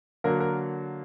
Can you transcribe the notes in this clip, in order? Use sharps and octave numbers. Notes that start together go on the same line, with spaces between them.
D3 F#3 A#3 A#4
A#4